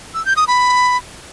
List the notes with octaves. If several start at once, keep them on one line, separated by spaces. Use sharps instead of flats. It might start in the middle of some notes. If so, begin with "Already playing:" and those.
E6
G6
D#6
B5